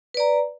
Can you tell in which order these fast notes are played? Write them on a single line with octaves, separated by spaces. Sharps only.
B4 D5 A#5